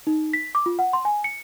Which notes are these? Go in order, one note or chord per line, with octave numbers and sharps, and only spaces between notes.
D#4
B6
D6
F4
F#5
C6
G#5
C#7